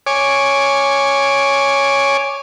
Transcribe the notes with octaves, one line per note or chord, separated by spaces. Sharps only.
C#5 G#5 D6